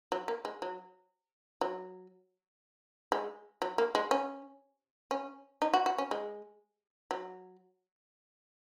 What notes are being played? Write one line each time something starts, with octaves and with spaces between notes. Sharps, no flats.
F#3
A#3
G#3
F#3
F#3
G#3
F#3
A#3
G#3
C#4
C#4
D#4
F#4
F#4
C#4
G#3
F#3